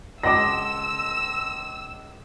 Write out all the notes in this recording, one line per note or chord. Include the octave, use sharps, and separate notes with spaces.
C#2 D#5 F#5 A5 C6 D6 E6 A#6